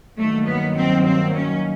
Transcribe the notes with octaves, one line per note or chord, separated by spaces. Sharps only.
G2 D#3 F#3 A3 A#3
B3
C4
C4
C#4